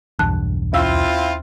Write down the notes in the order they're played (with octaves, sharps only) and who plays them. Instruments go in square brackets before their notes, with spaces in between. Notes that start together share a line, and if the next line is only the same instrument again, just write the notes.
[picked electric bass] B1 E2 G2 [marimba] A5 F#6
[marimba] D#2 F5 E6 [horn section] C4 E4 F4